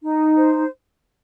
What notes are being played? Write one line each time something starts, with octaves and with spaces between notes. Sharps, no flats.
D#4
C5